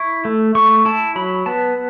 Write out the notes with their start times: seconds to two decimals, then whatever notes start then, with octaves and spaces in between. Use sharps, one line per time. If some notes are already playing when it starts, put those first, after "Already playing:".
Already playing: E4 C#6
0.25 A3
0.55 A3 C#6
0.85 E4 A5
1.16 F#3 B5
1.46 B3 A5